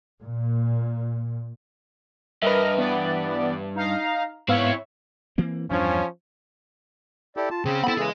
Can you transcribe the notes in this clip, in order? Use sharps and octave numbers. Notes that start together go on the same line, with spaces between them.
A#2
G2 A#4 B4 D#5 E5 F6
E3 B3 D5
D#4 F5 A#5
G#2 B3 C4 E4 C#5 E5 F5 C#6
E3 A#3 C4
E2 G2 F3 C#4 D4
E4 G4 A4 D5
F4 A5
C#3 C4 C#4 G#4
B3 E4 A4 B5
C#3 E3 G#3 G#4 D#5